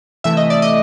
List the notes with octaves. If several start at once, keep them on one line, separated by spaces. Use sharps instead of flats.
C3 E3 A3 E5
D#5
D5
D#5